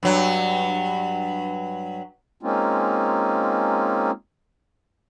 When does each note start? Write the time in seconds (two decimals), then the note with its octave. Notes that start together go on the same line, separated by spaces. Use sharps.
0.03 G2 F#3
2.43 G#3 A#3 C4 C#4 D#4 F4